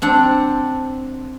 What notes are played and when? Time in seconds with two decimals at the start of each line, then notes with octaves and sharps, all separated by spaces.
0.02 C4 D4 F#5